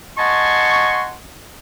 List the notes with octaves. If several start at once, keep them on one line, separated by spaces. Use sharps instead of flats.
D#5 F#5 G#5 A5 C6 C#6